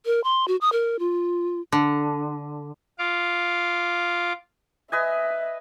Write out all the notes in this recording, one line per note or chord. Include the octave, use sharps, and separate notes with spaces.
A#4
C6
F#4
D#6
A#4
F4
D3
F4 F5 D6
B4 D#5 E5 G#5